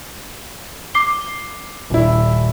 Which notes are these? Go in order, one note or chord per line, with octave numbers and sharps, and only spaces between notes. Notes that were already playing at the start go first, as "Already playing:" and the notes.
D6 C7 G7
D#1 E4